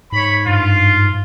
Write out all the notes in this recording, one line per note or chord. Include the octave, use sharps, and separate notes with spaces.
G#2 C#5 B5
G2 F4